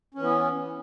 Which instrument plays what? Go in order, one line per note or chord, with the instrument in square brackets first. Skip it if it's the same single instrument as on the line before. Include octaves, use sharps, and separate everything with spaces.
[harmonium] C#4
E3
B3